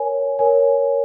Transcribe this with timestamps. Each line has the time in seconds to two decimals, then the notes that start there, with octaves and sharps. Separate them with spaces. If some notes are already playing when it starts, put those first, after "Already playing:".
Already playing: A#4 C#5 G#5
0.39 A#4 C#5 G#5